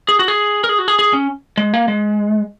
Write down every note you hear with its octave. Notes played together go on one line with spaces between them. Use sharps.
G#4
F#4
G#4
A#4
G#4
F#4
G#4
G#4
C#4
G#3
A#3
G#3